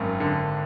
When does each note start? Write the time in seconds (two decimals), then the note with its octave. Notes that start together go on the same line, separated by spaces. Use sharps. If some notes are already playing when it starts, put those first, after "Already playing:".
Already playing: G#1 F#2
0.20 D3